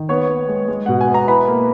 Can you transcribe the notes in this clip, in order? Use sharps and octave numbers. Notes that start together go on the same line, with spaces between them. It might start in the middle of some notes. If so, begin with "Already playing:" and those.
Already playing: D#3
B3 C#5 C#6
B3
G#3
G#3
B2 F#5
G#5
B3
A#5
E4 B4 B5
A#3